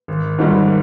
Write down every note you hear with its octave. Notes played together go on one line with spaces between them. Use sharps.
G#1
G#2 D#3 G3